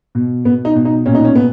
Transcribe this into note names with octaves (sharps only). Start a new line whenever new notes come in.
B2
B2 B3
D#4
B2
D#4
A#2 C#4
D#4
C#4
A#2 B3